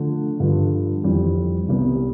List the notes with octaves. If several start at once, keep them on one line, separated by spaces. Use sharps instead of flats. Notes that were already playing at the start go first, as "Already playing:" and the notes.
Already playing: D3 F3 A3
G2 D3 F3
F2 E3 G3 C4
C2 C3 G3 B3